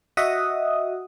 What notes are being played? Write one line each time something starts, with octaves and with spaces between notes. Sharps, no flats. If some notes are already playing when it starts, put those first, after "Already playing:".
F#4 D#5 E5 F#5 D#6